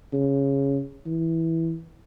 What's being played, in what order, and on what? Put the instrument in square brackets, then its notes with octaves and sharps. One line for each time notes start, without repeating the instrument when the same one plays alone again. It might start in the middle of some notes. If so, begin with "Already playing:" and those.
[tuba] C#3
E3